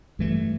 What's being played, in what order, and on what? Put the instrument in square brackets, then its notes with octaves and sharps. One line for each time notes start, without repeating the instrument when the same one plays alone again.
[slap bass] G2 E3 A3